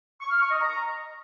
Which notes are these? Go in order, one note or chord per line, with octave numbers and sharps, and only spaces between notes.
C#6
F6
C#6
D#5
A#5